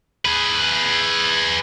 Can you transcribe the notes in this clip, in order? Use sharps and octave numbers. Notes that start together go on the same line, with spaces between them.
G#4 B4